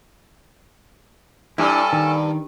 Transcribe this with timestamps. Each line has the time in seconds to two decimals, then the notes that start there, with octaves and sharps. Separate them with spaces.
1.58 G2 C#4 D4 E4 A4 A5
1.93 D#3